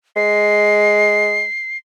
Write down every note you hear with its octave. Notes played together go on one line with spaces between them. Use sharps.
G#3 C7